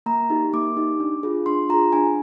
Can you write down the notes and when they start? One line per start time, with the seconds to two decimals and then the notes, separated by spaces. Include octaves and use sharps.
0.06 A#3 A#5
0.30 D#4 G4
0.53 A#3 D6
0.77 D#4 G4
1.00 D4
1.23 F4 G#4
1.46 D4 C6
1.69 F4 G#4 A#5
1.93 D4 G#5